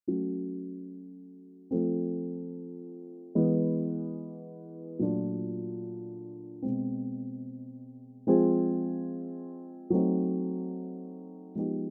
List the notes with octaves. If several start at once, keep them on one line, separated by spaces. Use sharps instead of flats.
F#3 A3 C#4 F#4
F3 A3 C4
E3 G#3 B3
A#2 F#3 A3 D4 F4
B2 G#3 C4
F3 G#3 C4 F4 G#4
F#3 A3 C4 D#4
F3 G#3 B3 D#4 G4